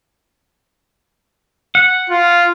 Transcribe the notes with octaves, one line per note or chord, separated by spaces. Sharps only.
F#5
F4